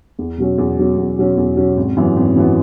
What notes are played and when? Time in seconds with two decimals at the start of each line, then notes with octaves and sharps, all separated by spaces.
0.19 E2
0.38 B2 F#3 C#4
0.58 E2
0.78 B2 F#3 C#4
0.97 E2
1.18 B2 F#3 C#4
1.37 E2
1.57 B2 F#3 C#4
1.77 G#1
1.96 F#2 E3 B3
2.16 G#1
2.36 F#2 E3 B3